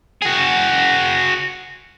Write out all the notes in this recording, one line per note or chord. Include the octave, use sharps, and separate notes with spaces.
F#4 G#4